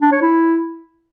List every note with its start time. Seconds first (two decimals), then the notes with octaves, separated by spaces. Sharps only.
0.02 D4
0.12 C#5
0.22 E4